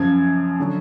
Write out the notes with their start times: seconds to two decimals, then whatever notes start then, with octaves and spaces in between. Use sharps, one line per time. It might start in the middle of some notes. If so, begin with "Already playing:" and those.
Already playing: F#2 C#3 F3 G#6
0.60 D3 F#3